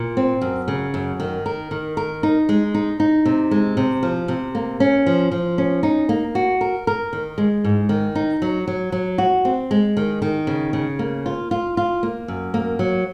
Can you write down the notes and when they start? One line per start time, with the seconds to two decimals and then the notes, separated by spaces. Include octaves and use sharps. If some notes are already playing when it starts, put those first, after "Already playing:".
Already playing: A#2
0.17 C4
0.41 F#2
0.68 C#3
0.94 F#2
1.20 D#3
1.46 A#4
1.71 D#3
1.97 A#4
2.23 D#4
2.49 G#3
2.74 D#4
3.00 D#4
3.25 C3
3.51 G#3
3.77 C3
4.03 F3
4.28 C3
4.55 A#3
4.80 C#4
5.06 F3
5.31 F3
5.58 C#4
5.83 D#4
6.09 A#3
6.35 F#4
6.61 A#4
6.87 A#4
7.13 D#3
7.38 G#3
7.64 G#2
7.89 D#3
8.15 D#4
8.42 F#3
8.67 F#3
8.92 F#3
9.18 F#4
9.45 C4
9.71 G#3
9.97 D#3
10.22 D#3
10.47 C#3
10.73 C#3
10.99 A#3
11.26 F4
11.51 F4
11.77 F4
12.03 A#3
12.28 F#2
12.54 A#3
12.79 F#3